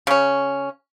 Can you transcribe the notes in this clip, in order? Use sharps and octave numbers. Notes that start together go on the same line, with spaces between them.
C#3 C#4